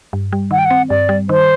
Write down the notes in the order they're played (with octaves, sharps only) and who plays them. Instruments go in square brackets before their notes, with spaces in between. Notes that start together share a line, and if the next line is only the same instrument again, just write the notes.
[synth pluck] G2
G3
[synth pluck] D#3 [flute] F#5
[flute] G5
F#5
[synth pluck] C4
[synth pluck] G2 [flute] D5
[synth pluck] G3
[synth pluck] D#3 [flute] C5